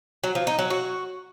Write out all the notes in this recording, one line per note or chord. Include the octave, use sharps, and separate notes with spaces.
F#3
F3
D#4
F#3
F#4